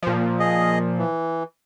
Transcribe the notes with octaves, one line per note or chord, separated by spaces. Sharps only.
A#2 F3
G#4 D#5
E3